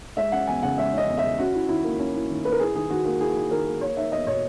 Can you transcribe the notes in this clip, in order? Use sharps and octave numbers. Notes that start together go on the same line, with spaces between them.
G#3 E5
C#4 F#5
E2 G#5
C#3 F#5
G#3 E5
C#4 D#5
E2
E5
C#3
C#4 F#4
E4
D#3 E4
A#3
C#4
E4
D#3
A#3 B4
A#4
E4 G#4
D#3 G#4
D#3 F#4
A#3 F#4
E4 G#4
D#3
D#3 A#4
A#3
A#3 C#5
D#4 E5
E2 D#5
B2 C#5